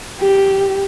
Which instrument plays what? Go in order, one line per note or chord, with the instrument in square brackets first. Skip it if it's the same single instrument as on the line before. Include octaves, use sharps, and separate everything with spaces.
[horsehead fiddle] G4